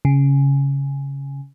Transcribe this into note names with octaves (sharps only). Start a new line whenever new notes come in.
C#3